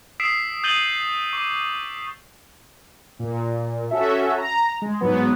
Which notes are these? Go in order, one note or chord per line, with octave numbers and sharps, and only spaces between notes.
D#6 E6 B6 C7 D7 E7
D#6 G6 A6 D#7 F#7 G7
C#6 D6
A#2
C#4 F#4 A4 E5
A#5
G#3
G#2 F#3 B3